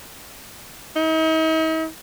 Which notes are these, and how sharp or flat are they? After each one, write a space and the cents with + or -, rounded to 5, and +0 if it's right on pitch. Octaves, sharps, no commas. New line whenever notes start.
D#4 +45